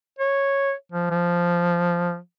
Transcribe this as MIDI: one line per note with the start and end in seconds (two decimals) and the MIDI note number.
0.19 0.73 73
0.92 1.09 53
1.11 2.17 53